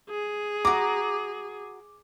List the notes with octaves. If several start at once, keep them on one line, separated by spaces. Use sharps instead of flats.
G#4
F#4 A#5 D6